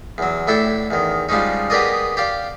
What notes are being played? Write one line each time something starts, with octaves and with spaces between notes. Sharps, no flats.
E2 F#3
A2 D4 E4 A4 G5
E2 D#3
F3 G3 G#3 C#4 D#4
B3 G4 G#4 A#4 D5 D#5
G4 D5 F5